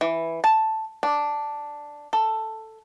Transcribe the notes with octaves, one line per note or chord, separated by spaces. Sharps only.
E3
A5
D4
A4